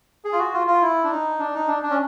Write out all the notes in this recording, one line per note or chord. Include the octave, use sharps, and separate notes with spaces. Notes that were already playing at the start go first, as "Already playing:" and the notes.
G#4
F4
F#4
F4
F4
E4
D4
D#4
D4
D#4
D4
D4
C#4